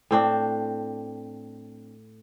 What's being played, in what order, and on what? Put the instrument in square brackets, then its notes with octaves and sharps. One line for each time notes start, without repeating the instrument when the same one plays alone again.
[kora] A2 C4 D4